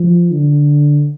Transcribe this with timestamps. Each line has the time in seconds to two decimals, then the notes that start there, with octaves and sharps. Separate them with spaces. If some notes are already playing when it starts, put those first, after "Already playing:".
Already playing: F3
0.31 D3